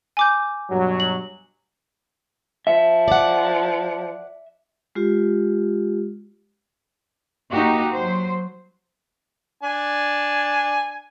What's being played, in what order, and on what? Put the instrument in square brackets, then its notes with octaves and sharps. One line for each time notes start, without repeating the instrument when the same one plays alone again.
[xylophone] G#5 D6 G6
[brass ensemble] G2 B2 F#3
[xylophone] F#7
[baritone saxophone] F3 [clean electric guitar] E5
[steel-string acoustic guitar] D5 F#5
[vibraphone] G#3 F4 G4
[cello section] A#3 D#4 F#4 G4
F#3 C5
[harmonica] D4 G#5